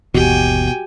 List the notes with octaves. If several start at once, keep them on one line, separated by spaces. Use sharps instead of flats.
G1 D#2 B2 E3 F#4 G4 G5 G#5